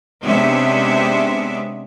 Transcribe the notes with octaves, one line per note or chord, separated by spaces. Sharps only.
C3 G#3 B3 C#4 D4 E5